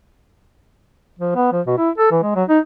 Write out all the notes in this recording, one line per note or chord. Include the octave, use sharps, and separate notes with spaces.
F3
B3
F3
B2
E4
A4
E3
G#3
F#3
D#4